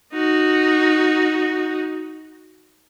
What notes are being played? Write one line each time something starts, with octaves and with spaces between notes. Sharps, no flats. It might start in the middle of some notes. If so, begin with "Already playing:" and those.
D#4 F#4